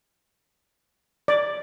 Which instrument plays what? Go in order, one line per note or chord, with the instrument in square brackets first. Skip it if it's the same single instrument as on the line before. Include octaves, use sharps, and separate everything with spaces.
[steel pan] D5